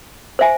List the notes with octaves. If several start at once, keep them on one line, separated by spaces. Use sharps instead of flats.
C5 E5 G#5